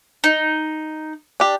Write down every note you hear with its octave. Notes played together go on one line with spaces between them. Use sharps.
D#4
D4 G4